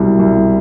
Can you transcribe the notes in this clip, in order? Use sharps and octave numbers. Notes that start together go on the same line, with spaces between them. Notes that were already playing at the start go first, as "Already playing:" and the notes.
Already playing: C2 B2 G3
C2